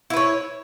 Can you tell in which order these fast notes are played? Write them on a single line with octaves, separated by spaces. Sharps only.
E4 B4 C#5